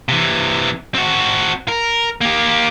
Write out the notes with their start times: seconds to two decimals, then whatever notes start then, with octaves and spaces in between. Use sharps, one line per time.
0.09 C3 E3
0.95 C4 F#4
1.68 A#4
2.21 A#3 G4